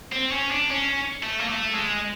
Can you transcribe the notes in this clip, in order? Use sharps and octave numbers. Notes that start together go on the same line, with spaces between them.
C4
C#4
D4
C#4
A3
A#3
A3
G#3